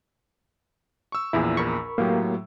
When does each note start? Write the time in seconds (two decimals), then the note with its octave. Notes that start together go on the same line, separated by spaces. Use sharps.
1.12 C#6 E6
1.33 A#1 E2 A#2 E4 G#4
1.57 A#4 B5 C#6
1.98 A2 F#3 A#3 B3 G4